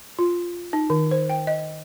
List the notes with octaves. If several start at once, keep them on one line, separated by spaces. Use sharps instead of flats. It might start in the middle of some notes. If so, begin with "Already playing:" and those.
F4
D#4
D#3
C5
G5
D#5